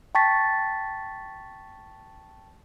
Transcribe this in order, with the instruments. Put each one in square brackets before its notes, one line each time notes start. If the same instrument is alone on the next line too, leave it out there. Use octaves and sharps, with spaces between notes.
[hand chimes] G5 A5 C#6 A6 B6